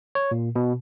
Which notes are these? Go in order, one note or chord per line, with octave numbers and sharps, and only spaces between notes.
C#5
A#2
B2